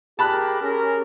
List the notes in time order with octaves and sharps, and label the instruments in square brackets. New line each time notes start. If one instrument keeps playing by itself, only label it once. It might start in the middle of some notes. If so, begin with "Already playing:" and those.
[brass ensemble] G4 G#4 A#4 [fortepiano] A5 B5 F#6
[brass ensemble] C#4 G#4 A#4